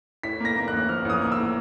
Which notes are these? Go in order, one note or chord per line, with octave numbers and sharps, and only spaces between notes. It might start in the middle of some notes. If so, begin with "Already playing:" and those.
A2 B6
A#3 A#6
A#3
F#6
A1
F3 F6
A1 D#6
A#3
A2 E6